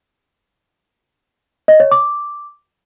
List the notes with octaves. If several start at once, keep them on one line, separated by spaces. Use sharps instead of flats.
D#5
C#5
D6